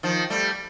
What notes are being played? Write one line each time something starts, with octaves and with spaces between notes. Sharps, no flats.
D#3 F3
G3 A3